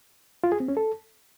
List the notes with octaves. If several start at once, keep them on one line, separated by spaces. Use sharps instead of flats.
F4
G#4
C4
C#4
A4